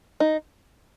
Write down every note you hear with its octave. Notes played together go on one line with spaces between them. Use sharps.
D#4